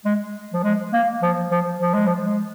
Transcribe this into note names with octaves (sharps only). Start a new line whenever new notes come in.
G#3
F3
G#3
A#3
F3
F3
F3
G#3
F3
G#3